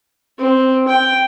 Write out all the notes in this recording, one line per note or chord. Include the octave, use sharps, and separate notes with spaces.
C4
G5